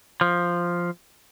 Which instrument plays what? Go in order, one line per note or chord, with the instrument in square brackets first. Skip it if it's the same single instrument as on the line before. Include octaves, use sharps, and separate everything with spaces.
[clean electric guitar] F3